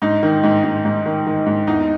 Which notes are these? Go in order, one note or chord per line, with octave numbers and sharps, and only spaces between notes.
G#2 D#4
D#3
G#2
G#2
G#2
D#3
D#3
G#2
E2 D#4